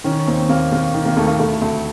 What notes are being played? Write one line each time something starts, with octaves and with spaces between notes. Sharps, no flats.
D#3 C#4
D#2 C4
D#2 A#3
D#2 A#3
D#3
A#3
D#2 A3
A#3
D2 A3
D2 A3